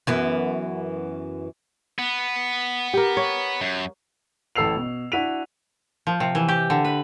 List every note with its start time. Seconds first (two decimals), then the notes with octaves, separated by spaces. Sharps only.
0.07 F#2 E3 B3
1.99 B3
2.94 G4 A#4
3.17 C#5
3.61 F#2
4.56 A1 A2 A4 E6 C7 F7
4.77 B2
5.12 D4 E4 F#4 B6 D#7 F7
6.07 F3
6.20 C3
6.35 E3
6.48 G4
6.70 D3
6.85 B4